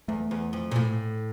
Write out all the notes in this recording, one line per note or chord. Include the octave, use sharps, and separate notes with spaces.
E2 A3
E2
F2
A#2
A2